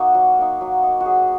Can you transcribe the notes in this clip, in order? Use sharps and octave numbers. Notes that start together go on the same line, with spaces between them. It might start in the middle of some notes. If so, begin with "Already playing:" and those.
Already playing: A#3 D#4 F#4
F#3
A#3 D#4
F#3
A#3 D#4
F#4
F#3 G#4